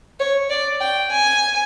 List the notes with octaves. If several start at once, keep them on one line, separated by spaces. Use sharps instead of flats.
C#5
D5
G5
G#5